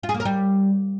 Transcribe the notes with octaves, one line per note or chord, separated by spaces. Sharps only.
F4
G#4
A#3
A#4
G3